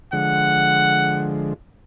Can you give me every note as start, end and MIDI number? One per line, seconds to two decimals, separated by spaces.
0.13 1.54 50
0.13 1.54 53
0.13 1.54 56
0.13 1.34 78